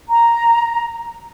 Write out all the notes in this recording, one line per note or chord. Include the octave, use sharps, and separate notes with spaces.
A#5